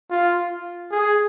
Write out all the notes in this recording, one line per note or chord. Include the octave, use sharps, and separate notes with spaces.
F4
G#4